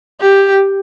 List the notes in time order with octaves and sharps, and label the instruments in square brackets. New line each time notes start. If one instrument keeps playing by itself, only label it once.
[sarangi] G4